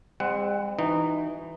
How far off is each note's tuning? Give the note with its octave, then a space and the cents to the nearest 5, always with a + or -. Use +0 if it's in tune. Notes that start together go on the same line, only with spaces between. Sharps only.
G#3 -45 C4 +0 F#5 +15
E3 +0 D#4 -15 F#4 +20